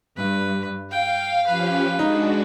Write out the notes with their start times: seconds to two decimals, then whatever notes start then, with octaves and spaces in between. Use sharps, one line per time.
0.17 G2 B4
0.91 F5 G5
1.47 F3 C#4 G4 B4
1.99 G#3 D4 D#4 F#4